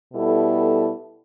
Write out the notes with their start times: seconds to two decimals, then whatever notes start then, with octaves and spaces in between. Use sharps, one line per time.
0.13 B2 G3 B3 E4 A4